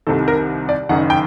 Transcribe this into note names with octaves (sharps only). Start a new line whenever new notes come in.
C2 C3 D#3 A4
A#4
D5
F#1 F#2 D#3 F#5
G5